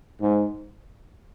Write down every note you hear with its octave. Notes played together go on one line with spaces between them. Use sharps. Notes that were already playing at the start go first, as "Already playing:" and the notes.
G#2